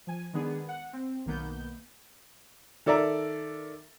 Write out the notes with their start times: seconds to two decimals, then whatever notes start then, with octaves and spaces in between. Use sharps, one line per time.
0.07 F3 G#5
0.33 D#3 G#3 B3 D4 G#4
0.69 F#5
0.93 C4
1.26 B1 D#3 A#3 B3 G6
2.86 D#3 A4 D5 E5 A#5